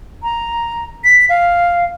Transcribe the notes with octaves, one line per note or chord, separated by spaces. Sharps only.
A#5
B6
F5